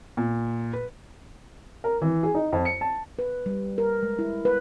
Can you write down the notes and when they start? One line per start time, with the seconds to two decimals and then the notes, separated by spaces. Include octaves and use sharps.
0.17 A#2
0.73 B4
1.84 A#4
2.01 E3
2.23 G#4
2.35 D#4
2.52 F2
2.65 C#7
2.81 A5
3.19 B4
3.46 G3
3.78 A#4
4.03 G#3
4.19 E4
4.45 B4